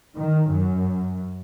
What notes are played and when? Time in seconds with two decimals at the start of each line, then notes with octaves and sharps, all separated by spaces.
0.16 D#3
0.51 F#2